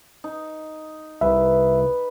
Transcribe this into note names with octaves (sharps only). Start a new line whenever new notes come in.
D#4
C2 B4 E5